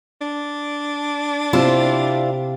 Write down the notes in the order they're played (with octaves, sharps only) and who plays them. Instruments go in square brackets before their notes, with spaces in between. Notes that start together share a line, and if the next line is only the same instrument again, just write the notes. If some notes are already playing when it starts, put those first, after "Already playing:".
[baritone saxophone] D4
[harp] C3 [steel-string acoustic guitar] E4 F4 C5